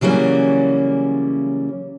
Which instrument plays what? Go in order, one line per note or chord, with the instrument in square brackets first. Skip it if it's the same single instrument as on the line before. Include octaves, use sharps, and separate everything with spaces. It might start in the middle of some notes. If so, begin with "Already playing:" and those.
[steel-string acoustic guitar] C#3 E3 F#3 G3 A#3 C#4